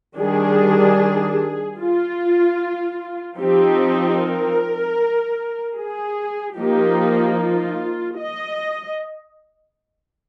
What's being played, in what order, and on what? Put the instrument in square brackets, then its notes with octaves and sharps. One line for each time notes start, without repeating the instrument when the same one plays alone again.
[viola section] D#3 G3 D4 G#4
F4
F3 C4 D#4 G4
A#4
G#4
F3 A#3 D#4 G4
F4
D#5